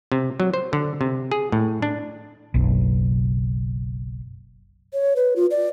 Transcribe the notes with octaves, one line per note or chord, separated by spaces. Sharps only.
C3
F#3
C5
D3
C3
G#4
A2
D4
F#1 B1
C#5
B4
F4
D5